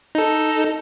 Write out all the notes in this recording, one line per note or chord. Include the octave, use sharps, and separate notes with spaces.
D#4 A4